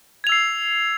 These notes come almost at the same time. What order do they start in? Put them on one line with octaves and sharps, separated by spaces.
G#6 F7 E6 C7